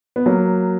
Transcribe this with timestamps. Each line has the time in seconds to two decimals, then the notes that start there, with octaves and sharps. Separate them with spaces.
0.16 B3
0.26 F#3 A#3